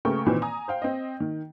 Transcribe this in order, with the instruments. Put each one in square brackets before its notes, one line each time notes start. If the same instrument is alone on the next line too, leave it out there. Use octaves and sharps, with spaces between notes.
[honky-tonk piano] C#3 A3 A#4 B4 G5 C#6
A#2 D#3 E3 C4 B4
G#5 A#5 D#6
C5 F5 G5
C4 D#5
D#3